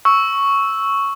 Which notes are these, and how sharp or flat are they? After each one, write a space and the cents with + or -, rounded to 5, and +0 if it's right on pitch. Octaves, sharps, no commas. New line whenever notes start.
C#6 +0 E6 -5